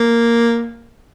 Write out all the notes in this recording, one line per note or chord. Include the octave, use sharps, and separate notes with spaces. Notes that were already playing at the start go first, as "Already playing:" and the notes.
Already playing: A#3